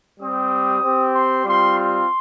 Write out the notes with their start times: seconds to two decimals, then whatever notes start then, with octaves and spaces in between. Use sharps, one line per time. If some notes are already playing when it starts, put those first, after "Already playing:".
0.20 G3 C4 G4 D#6
0.83 C4 G4
1.14 C6
1.45 G3 C4 F4 C6
1.77 C6